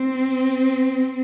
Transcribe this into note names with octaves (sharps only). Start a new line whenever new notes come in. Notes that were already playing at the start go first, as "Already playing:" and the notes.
Already playing: C4